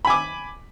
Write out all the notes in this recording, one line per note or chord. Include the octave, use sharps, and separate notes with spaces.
G#5 B5 D6